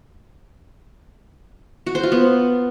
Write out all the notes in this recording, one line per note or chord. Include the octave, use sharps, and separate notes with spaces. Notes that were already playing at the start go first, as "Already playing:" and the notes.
F#4
C5
F4
B3